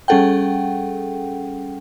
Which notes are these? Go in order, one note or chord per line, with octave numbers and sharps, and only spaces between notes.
G3 C#4 G#4 A4 F#5 G5